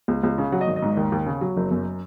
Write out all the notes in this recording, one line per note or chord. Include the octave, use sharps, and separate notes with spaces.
C#2
C#2
C#3
F#3 F#5
D#5
G#1
D#5
G#2
D#2
D#2
C#3
F#3
F#1
F#2